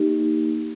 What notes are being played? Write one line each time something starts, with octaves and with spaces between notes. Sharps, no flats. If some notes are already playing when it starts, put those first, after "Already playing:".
Already playing: A#3 D#4 G4